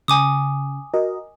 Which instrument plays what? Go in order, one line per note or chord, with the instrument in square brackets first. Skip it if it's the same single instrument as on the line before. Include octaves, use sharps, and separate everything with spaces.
[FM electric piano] C#3 [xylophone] G#5 D6 D#6
[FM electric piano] F#4 A#4 D#5